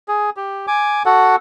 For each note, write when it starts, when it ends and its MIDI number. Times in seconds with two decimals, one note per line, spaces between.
0.08 0.30 68
0.37 0.66 67
0.67 1.03 80
0.67 1.03 86
1.06 1.36 66
1.06 1.36 69
1.06 1.36 78